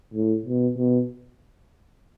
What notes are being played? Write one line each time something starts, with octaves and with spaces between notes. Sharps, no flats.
A2
B2
B2